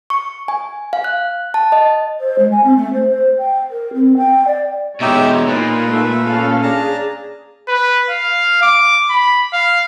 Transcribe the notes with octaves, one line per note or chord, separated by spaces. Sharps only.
C#6
G#5
F5
F#6
A5
D#5
C5
G#3
G#5
C4
A3
C5
C5
G5
A#4
C4
G5
D5
B2 G#3 D#4 G4 C#5 E5
A#2 D#4 A#4 B4 C6
A3 E5
C#4 A4 F5
D4 G#4 A5 A#5
B4
F5
D6
B5
F5